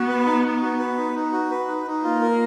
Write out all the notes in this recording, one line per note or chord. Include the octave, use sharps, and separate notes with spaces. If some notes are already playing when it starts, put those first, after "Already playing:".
Already playing: B3 F#4
B4
D#4
D#4
F#4
B4
D#4
D#4
F#4
B4
D#4
D#4
A#3 F4
A#4